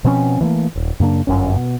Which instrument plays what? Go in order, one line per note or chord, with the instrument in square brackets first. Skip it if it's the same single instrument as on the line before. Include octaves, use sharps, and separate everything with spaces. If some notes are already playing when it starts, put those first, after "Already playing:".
[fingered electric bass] B2 F3 C4 C#4
E3 F#3 A3 A#3
D#1
F#2 C#3 A#3 D4
G1 F#2 C#4
B2